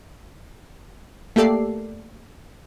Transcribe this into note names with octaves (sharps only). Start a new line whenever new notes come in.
A3 A#3 G4 A4 D5 C7